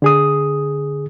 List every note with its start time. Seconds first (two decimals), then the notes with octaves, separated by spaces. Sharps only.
0.02 D3 G#4 D#6